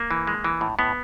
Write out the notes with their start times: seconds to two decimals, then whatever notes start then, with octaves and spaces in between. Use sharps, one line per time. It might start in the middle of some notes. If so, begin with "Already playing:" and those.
Already playing: A#3
0.11 E3
0.27 G#3
0.44 E3
0.61 A2
0.79 A2 B3